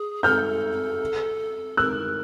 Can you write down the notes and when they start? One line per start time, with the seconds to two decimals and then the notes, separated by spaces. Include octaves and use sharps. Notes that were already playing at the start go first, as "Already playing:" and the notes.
Already playing: G#4
0.23 A4 F6 G6
1.77 A#4 E6 F#6